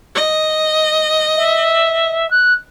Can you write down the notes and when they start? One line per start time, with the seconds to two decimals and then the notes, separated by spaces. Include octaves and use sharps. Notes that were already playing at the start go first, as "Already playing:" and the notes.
0.15 D#5
1.36 E5
2.31 F#6